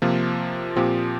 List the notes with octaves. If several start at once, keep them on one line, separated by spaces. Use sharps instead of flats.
C3 F3 A#3 F4
A#2 F3 C4 G4